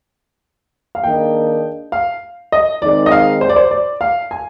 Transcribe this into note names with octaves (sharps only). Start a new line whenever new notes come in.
F5
D#3 A#3 D4 G#4 D#5 G5
F5
D#5
D#3 G#3 C4 D#4 G#4 D5
D#5
F5
C5
D5
C5
D5
F5
G#5